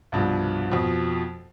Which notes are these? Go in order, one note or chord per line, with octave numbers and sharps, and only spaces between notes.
C2 G2 B2 F3
F2 B2 F3